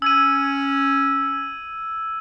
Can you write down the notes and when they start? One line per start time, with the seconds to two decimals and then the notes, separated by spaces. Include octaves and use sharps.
0.02 C#4 E6 G#6 D#7